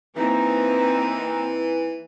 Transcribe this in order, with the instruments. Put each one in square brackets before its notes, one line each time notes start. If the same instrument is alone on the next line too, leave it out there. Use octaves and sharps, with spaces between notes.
[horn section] E3 [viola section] A#3 C4 D#4